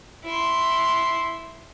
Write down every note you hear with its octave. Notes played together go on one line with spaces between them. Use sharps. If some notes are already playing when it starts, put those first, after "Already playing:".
E4 C6